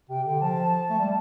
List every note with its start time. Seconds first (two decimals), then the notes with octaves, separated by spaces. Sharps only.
0.09 C3 G5
0.26 D3 G5
0.41 F3 A5
0.90 A3
0.98 G3